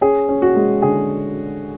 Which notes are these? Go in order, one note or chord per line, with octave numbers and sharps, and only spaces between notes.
C#4 G#4
C#4
F#4
G#3
D3 G#4